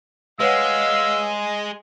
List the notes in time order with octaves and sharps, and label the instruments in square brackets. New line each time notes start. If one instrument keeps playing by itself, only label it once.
[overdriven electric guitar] G#3 [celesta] B4 C#5 F#5 [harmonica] F5 E6